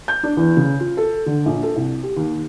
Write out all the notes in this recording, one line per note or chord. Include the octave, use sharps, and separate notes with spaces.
G6
D4
E2
C#3
F4
A4
D3
A#1
A4
C2
G4
D#2